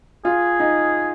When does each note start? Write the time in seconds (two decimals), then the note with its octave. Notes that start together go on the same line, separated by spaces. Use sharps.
0.25 F4 G#4
0.60 D#4